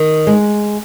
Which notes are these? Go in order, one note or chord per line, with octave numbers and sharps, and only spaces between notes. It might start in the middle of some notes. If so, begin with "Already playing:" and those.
Already playing: D#3
G#3